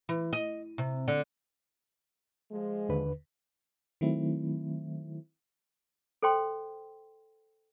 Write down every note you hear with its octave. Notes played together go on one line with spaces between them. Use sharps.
E3
D#5
C3
D3
F3 G#3
D#2 D3 B4
D#3 F#3 A3 C4 E4
A4 C5 G5 C6